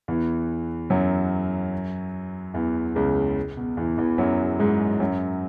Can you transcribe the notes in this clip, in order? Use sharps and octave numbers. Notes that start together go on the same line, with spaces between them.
E2 E3
F#2 F#3
E2 E3
C#2 C#3
B2
E2 E3
E2 E3
F#2 F#3
G#2 G#3
F#2 F#3